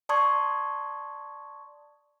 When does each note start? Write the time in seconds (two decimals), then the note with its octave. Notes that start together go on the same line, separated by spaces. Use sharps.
0.09 D5 A5 C6 C#6 D#6 G#6